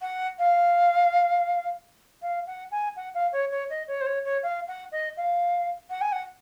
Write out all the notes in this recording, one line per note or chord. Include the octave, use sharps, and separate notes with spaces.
F#5
F5
F5
F#5
G#5
F#5
F5
C#5
C#5
D#5
C#5
C5
C#5
C#5
F5
F#5
D#5
F5
F#5
G#5
F#5